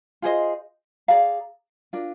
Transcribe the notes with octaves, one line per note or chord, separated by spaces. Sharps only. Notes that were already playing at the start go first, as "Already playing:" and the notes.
F4 G#4 C5 D#5
G#4 D5 F5 A#5
D4 F4 A#4